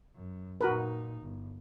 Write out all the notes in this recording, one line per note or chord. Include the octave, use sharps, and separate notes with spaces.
F#2
A#2 D#4 F#4 A#4 B4
G1